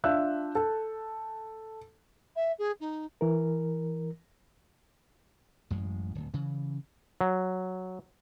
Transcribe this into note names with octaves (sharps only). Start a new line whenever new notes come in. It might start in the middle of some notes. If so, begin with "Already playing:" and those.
D4 F4 E5 E6 F#6 G6
A4
E5
G#4
D#4
E3 A#4
A1 F#2 G#3
D1
C#3 E3
F#3